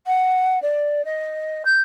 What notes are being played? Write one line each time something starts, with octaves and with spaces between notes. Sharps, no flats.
F#5
D5
D#5
G6